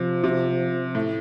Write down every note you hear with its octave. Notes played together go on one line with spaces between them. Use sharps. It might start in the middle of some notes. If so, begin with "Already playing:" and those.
Already playing: C3 F3
C3
A2